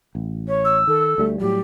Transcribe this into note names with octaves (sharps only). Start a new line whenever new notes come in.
A1
C#5
E6
D#3 A4
D2 G3 A3
A2 F#3 G3 G4